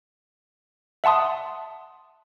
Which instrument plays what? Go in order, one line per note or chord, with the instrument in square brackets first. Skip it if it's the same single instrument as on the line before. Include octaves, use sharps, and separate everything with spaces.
[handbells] E5 F#5 A5 C6 D#6